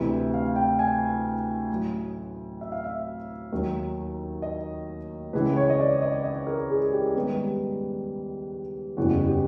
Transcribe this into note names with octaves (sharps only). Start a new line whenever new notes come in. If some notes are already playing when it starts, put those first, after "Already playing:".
Already playing: D2 C3 E3
F5
G5
G#5
A1 A2 F#3
E5
F5
E5
D#2 D#3 F#3
D#5
C#2 C#3 E3 G#3 B4
C#5
D#5
D5
D#5
D#5
A#4
G#4
G4
G#2 D#3 G3 B3
F#1 E2 C#3 E3 G3 F#4
G4